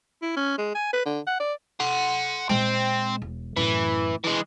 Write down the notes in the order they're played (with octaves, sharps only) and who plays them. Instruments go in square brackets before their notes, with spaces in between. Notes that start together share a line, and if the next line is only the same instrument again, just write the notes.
[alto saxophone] E4
C#4
G#3
G#5
B4
D3
F#5
D5
[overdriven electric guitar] F#5 C6
[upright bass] A#2 G#3 [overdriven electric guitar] C4
[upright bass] E1
[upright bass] F#2 A2 [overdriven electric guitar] E3
[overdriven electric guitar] E3 G#3